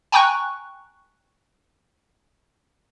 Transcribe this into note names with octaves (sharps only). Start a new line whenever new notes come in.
G5 G#5 A#5 C#6 F#6